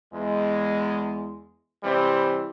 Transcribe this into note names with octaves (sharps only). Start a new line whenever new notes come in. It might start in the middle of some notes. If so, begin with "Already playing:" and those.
E2 G#3
C3 E3 G3 C4